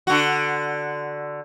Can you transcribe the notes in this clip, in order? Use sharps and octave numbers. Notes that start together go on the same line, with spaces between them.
D3 F#4